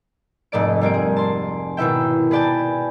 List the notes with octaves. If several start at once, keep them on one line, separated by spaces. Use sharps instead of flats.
F1 G#2 A3 D5 D7
G3 A#3 C4 D7
G#4
A5 C6
G#1 B2 E4 E5 G5
G#4 B4 D5 G5 A5